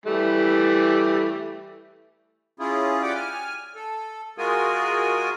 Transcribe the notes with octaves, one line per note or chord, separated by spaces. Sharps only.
E3 G3 A3
C#4 E4 F4 G#4
G4 D5 F#5 G5 D6
G#5 F6
A4
G#3 F4 F#4 G#4 A#4 G#5